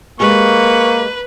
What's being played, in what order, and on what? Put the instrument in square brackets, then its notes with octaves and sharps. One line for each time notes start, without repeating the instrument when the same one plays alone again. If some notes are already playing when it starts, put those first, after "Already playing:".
[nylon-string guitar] G#3 G4 G#4 [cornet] A#3 [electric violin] B4 [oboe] C#6